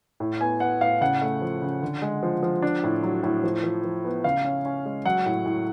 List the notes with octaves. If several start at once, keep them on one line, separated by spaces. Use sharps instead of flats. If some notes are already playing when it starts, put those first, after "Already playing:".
A2
B3 G#5
B3 F#5
A2 F5
C#3 F#5
A3
F3
C#3
D3
G#3
F3
F3
D4
A2
F#3
A2
F3
F3
F3
B3
C#3 F5
C#4
C#4
G#3
F#3 F#5
A2
A2